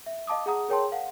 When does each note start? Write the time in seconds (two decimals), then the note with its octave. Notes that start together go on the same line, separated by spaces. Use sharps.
0.06 E5
0.27 D#5 F5 A5 D6 D#6
0.46 G#4 F#5 A#5 D#6
0.69 G#4 A#4 C#5 G5 A5 C6
0.92 F5 F#5